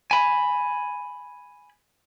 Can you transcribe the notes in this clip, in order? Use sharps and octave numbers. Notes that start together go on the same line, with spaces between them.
G#5 B5